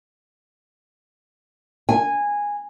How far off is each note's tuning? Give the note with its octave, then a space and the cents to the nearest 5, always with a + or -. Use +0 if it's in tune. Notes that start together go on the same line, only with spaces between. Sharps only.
G#5 -10